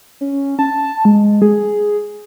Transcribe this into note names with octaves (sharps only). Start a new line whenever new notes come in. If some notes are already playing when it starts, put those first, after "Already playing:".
C#4
A5
G#3
G#4